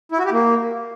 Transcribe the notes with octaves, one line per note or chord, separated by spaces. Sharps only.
E4
F#4
G4
A#3